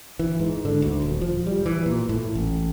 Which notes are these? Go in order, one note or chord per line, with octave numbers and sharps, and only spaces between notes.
E3
G#2
D3
D2
D#1
F3
G3
E3
A#2
A2
A1